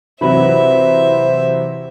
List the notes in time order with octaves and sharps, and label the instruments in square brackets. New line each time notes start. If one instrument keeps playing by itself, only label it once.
[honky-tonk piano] C3 E3 F#3 [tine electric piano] E4 B4 B5 [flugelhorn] C5 [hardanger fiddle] E5